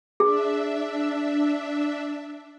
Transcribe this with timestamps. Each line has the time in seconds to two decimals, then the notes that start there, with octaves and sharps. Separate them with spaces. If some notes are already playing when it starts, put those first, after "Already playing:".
0.20 D4 G#4 E5